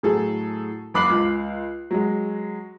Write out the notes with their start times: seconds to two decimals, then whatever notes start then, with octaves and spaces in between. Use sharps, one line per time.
0.03 A2 F#3 G#4 A4
0.94 F#1 B5 D6 F#6 C7 F#7
1.10 C#2
1.91 F#3 G#3